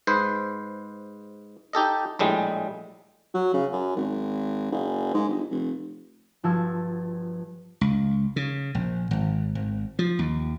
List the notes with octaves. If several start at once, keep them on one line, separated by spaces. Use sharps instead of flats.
G#2 B4 C5
D#4 G4 A4 D#5
A#1 A2 G3 G#3
F#3
C#3
F#2
G#1
F#1
G#2
G1
F1
G1 F3 F#4 A5 E6 G#6
C#2
C#3
A#1
G#1
G#1
F3
D#2